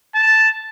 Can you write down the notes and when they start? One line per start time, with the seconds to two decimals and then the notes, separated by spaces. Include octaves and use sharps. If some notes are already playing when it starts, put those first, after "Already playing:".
0.15 A5